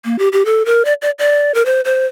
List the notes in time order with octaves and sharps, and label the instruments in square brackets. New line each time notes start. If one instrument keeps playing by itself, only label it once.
[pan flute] A#3
G4
G4
A4
A#4
D5
D5
D5
A#4
C5
C5